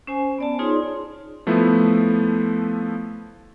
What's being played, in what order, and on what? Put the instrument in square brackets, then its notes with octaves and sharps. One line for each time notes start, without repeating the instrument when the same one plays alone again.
[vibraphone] C#4 C5 G#5
B3 D5 A5
D#4 F4 G#4 C#5 C6
[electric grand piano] F3 A3 B3 E4